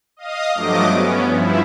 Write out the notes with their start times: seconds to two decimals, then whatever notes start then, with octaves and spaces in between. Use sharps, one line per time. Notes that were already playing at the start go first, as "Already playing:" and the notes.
0.17 D#5 F5 D#6
0.55 G2 F3 F#3 A3 D#5 D6
0.86 B3 C#4
1.29 G2 F3 E4